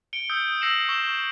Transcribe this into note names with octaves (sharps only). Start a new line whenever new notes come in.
C#7 D7 G7
D#6 E6 G6
E6 A#6 C7 C#7 E7 F#7
C#6 E6 E7 G7